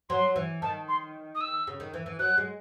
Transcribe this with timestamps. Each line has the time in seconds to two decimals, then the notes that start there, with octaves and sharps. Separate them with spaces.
0.09 F#3 C6
0.36 E3
0.62 D#3 A5
0.88 C6
1.35 D#6
1.41 E6
1.67 C#3
1.80 D#3
1.94 E3
2.06 E3
2.19 F#3 F#6
2.37 G#3